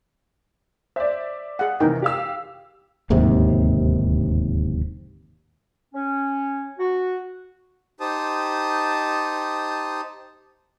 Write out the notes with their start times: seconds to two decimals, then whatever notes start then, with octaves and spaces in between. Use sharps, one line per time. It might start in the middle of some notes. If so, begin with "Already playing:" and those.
0.96 C5 D5 E5
1.59 G#4 F5 F#5
1.80 C3 D#3 E3 D#4 A#4 G5
2.02 G4 F5 E6
3.10 D1 D#2 G#2 C3
5.94 C#4
6.79 F#4
8.00 D#4 G4 C5 A5 D#6